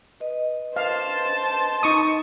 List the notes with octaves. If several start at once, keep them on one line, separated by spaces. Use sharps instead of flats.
B4 D#5
C5 F5 A5
D#4 C#6 D#6